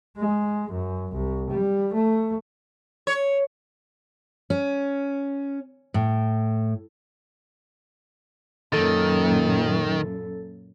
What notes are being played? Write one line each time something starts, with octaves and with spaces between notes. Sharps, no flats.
G#3
F#2
C2
G3
A3
C#5
C#4
A2
F#2 A#2 D#3 A4 A6